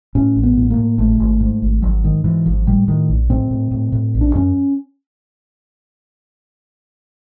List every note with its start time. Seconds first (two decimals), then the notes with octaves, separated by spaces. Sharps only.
0.15 A2 C#4
0.36 A1
0.43 B3
0.57 A2
0.70 A#3
0.77 A2
0.98 G#1 A3
1.20 G#1
1.40 G#2
1.62 G#1
1.82 G#1 F#3
2.03 G#2 D#3
2.24 G#2 E3
2.46 G#1 F3
2.67 A2 G3
2.88 A2 D#3
3.09 A#1
3.30 A2 C4
3.51 A2
3.71 A2
3.92 A2
4.15 A#1
4.21 D4
4.35 F#2 C#4